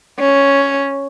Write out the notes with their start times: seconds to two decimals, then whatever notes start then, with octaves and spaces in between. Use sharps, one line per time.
0.19 C#4